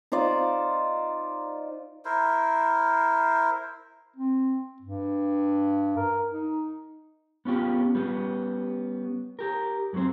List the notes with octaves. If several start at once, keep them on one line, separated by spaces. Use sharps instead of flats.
D#4 F4 C5 D5
E4 A#4 C5
C4
G2
A#4
D#4
B3 C#4 F4 G4
G3 B3 C#4
G4 A#4
F#2 F#3 A3 C4 C5